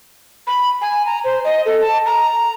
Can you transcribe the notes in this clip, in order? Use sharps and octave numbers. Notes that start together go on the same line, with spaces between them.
B5
G#5
A#5
C5
D#5
A4
A5
A#5